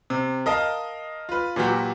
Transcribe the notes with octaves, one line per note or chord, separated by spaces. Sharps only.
C3
A#4 D#5 F5 A5
F4 B4
A#2 E3 F#3 F#4 G4